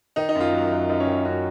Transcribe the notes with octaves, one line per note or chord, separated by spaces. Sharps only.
D#3 D#4
D#4
F#2
F4
F#3
F#2
F#2 D#4
C#4
D#3
F#2 F#4